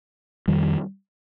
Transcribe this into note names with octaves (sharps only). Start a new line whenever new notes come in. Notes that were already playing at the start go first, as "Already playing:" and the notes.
F2 D#3 G3